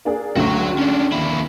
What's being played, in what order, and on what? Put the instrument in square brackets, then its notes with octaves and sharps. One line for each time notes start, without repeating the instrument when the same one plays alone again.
[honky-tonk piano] A#3 D4 G#4
[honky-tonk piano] C#2 D3 A3 [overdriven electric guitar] F#4 C#5
[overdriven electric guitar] C#4 D4
D#2 E4